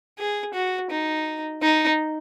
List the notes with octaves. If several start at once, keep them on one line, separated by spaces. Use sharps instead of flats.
G#4
F#4
D#4
D#4